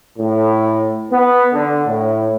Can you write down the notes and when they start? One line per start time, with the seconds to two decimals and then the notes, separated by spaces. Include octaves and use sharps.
0.18 A2
1.11 B3
1.52 D3
1.86 A2